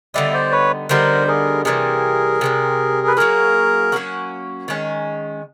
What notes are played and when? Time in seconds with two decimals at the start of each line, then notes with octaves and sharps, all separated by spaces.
0.14 D3 G3 B3 D#4 D5 E5
0.33 C5 D5
0.52 B4 C#5
0.89 D3 G3 B3 D#4 A#4 C5
1.28 G#4 A#4
1.65 C3 E3 G3 G#4 A#4
2.41 C3 E3 G3
3.07 B4
3.16 F#3 A#3 C#4 F#4 G#4 A#4
3.92 F#3 A#3 C#4 F#4
4.68 D#3 G#3 C#4